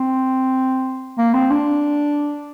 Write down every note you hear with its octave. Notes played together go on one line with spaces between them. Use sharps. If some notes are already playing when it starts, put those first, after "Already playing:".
Already playing: C4
A#3
C4
D4